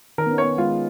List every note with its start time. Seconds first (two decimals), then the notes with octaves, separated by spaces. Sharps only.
0.18 D#3 A#4
0.26 B3
0.31 C#4
0.38 C#5
0.44 B3
0.58 G#3 F4